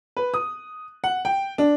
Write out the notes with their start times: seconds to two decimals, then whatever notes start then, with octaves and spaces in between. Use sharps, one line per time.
0.17 B4
0.34 D#6
1.04 F#5
1.25 G5
1.58 D4